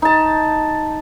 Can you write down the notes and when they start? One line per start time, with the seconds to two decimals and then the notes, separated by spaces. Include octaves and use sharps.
0.02 D#4 A5